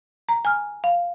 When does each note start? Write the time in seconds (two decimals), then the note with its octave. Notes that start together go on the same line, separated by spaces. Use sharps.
0.29 A#5
0.45 G#5 F6
0.84 F5